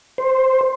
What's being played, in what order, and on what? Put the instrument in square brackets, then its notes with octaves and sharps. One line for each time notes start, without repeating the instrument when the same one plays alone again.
[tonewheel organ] C5